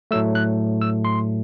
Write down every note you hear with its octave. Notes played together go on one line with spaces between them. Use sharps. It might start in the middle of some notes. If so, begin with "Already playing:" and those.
A2 F#3 A3 E6
F#6
E6
C6